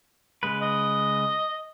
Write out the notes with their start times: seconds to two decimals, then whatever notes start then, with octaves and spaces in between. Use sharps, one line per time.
0.43 C#3 G#3 B4
0.61 D#5